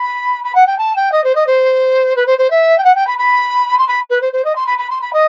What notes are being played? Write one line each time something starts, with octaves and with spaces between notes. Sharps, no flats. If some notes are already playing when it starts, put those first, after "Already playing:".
Already playing: B5
B5
F#5
G5
A5
G5
D#5
C5
D#5
C5
B4
C5
C5
E5
G5
F#5
G5
B5
B5
C6
B5
B4
C5
C5
D#5
C6
B5
B5
C6
B5
D#5